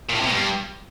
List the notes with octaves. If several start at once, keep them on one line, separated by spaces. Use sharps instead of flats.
A#2
A2
C3
B2
G2